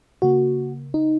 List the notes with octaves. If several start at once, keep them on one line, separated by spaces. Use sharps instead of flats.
C#3 A#3 F#4
D#4